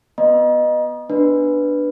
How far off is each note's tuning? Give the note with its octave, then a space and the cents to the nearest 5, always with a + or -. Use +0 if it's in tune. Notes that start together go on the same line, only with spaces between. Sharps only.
B3 +0 D#5 -15 A#5 +40
B3 +0 D4 +5 B4 +0